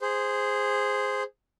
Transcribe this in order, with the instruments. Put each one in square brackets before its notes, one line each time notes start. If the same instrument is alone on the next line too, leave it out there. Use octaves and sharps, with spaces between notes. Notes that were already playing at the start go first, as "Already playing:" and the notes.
[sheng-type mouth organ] G#4 C5